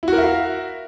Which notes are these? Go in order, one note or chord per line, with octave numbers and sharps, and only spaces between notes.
E4 F#4 A#4 E5 F5